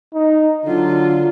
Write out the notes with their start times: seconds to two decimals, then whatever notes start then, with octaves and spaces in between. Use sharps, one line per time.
0.14 D#4
0.65 D3 F#3 F4